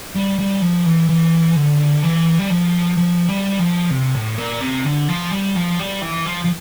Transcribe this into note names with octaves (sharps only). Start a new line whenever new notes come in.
G3
G3
F3
E3
E3
D3
E3
G3
F3
F3
G3
F3
C3
A2
A#2
C3
D3
F3
G3
F3
G3
E3
F3
F3